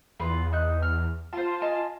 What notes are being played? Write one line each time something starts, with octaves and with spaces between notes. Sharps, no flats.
E2 F4 B4
D#4 F#6
F6
F4 C5 A5
D#5 G#5 A5